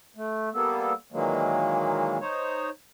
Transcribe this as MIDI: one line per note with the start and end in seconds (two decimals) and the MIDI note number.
0.16 0.49 57
0.53 0.93 55
0.53 0.93 58
0.53 0.93 59
0.53 0.93 69
1.12 2.18 46
1.12 2.18 51
1.12 2.18 52
1.12 2.18 54
1.12 2.18 56
1.12 2.18 58
2.21 2.70 63
2.21 2.70 72
2.21 2.70 73